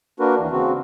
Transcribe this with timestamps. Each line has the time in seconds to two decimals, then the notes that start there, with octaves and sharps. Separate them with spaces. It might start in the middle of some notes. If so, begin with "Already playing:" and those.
0.20 A#3 D4 F#4 A#4 B4
0.39 D#2 E3
0.51 C#3 C4 F#4